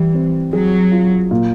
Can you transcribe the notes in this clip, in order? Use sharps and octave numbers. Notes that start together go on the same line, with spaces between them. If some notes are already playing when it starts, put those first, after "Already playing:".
Already playing: E3 G3
C4
F#3 G#4
F4
A#2